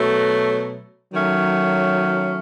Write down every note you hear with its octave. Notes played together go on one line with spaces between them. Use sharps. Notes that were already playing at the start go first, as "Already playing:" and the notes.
Already playing: B2 F#3 A3
D#3 F#3 A3 C#4